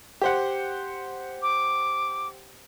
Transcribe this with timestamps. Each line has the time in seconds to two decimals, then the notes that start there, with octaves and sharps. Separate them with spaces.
0.21 G4 C5 F#5
1.42 D6